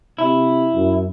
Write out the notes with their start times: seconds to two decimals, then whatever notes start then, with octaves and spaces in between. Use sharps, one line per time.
0.19 C3 E4
0.74 F#2